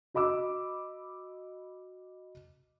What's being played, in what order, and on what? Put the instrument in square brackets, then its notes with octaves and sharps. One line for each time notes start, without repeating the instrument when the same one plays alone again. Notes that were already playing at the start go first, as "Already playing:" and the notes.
[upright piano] F#4 D#5 B5 D6 E6